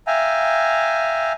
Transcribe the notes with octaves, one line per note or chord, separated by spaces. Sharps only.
E5 F5 G5 G#5 A#5